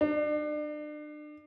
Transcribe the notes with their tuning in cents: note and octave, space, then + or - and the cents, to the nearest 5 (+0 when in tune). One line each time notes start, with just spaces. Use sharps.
D4 +35